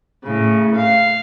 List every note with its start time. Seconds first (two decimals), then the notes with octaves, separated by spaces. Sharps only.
0.24 A2 C#3
0.75 F5